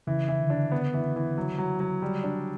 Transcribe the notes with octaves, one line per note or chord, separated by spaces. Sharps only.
C#3 E3
E3
D3
D4
B3
E3
E3
F#3
F#3
F#3
G3
D4